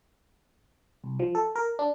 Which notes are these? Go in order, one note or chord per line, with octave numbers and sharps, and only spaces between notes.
C2
F3
A4
A#4
D4